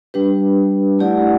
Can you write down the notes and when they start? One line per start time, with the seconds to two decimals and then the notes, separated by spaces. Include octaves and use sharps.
0.14 G3 D4 G4 B4
0.99 A3 E4 G4 D5 F#5